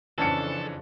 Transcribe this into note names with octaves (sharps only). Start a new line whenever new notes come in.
F2 C#3 E3 C#4 D4 A4 A5 C#7